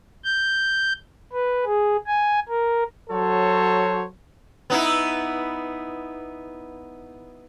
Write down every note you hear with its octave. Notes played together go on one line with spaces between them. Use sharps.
G6
B4
G#4
G#5
A#4
F#3 F#4 A4 C5 C#5
B3 D#4 E4